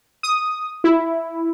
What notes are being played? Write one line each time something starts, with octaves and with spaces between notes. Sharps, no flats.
D#6
E4